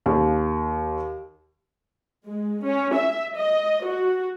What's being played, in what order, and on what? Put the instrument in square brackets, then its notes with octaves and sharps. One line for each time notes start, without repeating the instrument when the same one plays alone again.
[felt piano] D#2
[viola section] G#3
C#4
E5
D#5
F#4